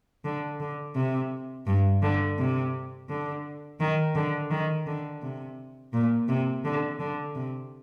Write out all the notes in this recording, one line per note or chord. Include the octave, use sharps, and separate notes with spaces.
D3
D3
C3
G2
D3
C3
D3
D#3
D3
D#3
D3
C3
A#2
C3
D3
D3
C3